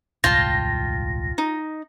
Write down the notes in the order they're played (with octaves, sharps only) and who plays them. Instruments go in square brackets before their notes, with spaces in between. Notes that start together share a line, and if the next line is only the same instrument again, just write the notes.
[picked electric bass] D#1 C2 G#2 [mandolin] F4 [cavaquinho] G5 A5 [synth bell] A#6
[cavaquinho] D#4